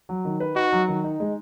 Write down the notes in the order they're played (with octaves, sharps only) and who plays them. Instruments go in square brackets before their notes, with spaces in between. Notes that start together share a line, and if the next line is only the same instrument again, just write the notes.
[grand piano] F#3
D#3
B4
[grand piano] D#4 [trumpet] F#4
[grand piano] F#3
D#3
D#4
G#3